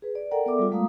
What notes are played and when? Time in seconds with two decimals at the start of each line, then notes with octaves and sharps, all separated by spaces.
0.02 G#4 B4
0.15 D5
0.31 A4 A#4 D5 F#5 G5 A#5
0.46 B3 G#4 A4 D5 E5 D6
0.59 G3 F4
0.71 G#3 A3 F5 A#5 D#6